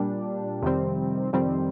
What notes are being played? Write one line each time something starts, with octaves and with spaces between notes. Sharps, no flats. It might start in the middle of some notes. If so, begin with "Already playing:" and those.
Already playing: A#2 G3 D4
F2 C3 D#3 G3 C4
F2 C3 D#3 G3 C4